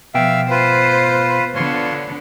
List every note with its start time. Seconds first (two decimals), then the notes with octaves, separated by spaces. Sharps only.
0.14 B2 F3 B3 E5 F5 G5
0.50 F4 B4 C5
1.55 D3 B3 F4 C#5 C6